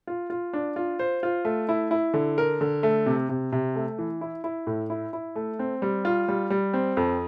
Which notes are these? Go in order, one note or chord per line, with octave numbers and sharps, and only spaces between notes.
F4
F4
D4
F4
C5
F4
A3
E4
E4
D3
A#4
D3
A3
C3
C3
C3
A3
E3
E4
E4
A2
E4
E4
A3
C4
G3
F4
G3
G3
C4
F2